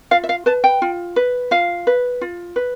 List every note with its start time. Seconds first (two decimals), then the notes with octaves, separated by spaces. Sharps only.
0.11 F4 F5
0.24 E5
0.29 F5
0.46 B4 A5
0.64 G5
0.82 F4
1.16 B4
1.51 F4 F5
1.87 B4
2.21 F4
2.56 B4